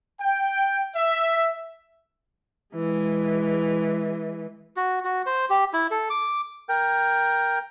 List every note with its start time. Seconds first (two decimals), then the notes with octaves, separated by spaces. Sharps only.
0.20 G5
0.96 E5
2.75 E3 G#3
4.77 F#4
5.04 F#4
5.26 C5
5.50 G4
5.73 E4
5.91 A4
6.10 D6
6.69 A#4 G5